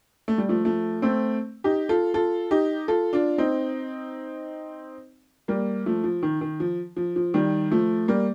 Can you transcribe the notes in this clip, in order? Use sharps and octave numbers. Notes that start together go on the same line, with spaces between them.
A3
G3
F3 A3
F3 A3
A3 C4
D#4 G4
F4 A4
F4 A4
D#4 G4
F4 A4
D4 F4
C4 D#4
G3 A#3
F3 A3
F3
D#3
D#3
F3
F3
F3
D#3 G3
F3 A3
G3 A#3